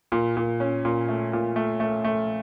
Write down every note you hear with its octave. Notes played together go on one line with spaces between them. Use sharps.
A#2
A#2
C#4
A#2
A3
A#2
A3
A3
A3